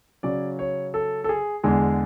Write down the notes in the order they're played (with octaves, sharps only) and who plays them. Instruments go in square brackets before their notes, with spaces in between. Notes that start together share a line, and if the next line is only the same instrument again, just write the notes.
[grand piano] C#3 F#3 C#4 D5
C#5
A4
A4
G#4
E2 D3 G#3 G#4